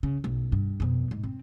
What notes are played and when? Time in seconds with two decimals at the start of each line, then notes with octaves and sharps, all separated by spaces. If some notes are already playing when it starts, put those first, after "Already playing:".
0.03 C#3
0.24 B1
0.52 G2
0.80 F2 B2
1.11 G#2
1.24 C4